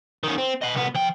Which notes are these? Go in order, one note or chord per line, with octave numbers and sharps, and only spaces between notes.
D#3 C#4
C4
D#5 F#5
C2 B3
F3 G5